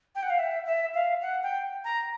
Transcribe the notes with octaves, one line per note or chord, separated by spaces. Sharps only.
G5
F#5
F5
E5
E5
F5
F#5
G5
A#5